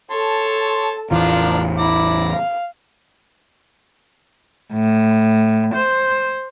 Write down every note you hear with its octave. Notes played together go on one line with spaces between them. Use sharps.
A4 C#5 A5 C6
A1 E2 E3 F3 D4 F4 A#4
E4 D5 A#5
F5
A2
C5